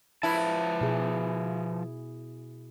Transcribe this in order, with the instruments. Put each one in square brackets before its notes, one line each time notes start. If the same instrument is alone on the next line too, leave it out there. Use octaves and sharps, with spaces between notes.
[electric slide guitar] F3 B4 A5 [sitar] E4
[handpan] B2 G#4